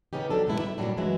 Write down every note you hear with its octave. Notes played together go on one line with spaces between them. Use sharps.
C#3 B3 C#4 D#4 G4
F3 F#3 D4 G4 A4
F#2 D#3 G#3 B3 E4 G4
G3 E4 E5
G2 A#2 E3 F#3 G3 D4
F#2 E3 F#3 G#3 E4